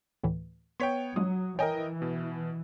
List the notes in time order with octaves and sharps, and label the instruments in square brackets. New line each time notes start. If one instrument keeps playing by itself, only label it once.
[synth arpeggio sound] D2 A2 E3
[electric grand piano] B3 C#5 G5 [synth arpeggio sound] C6 G#6 B6
[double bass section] F#3 [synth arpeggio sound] G#3 D4 F4 [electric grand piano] D#6
[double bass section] E3 [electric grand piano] A#4 D#5 G5 [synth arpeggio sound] C#5 G#5
[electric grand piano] B2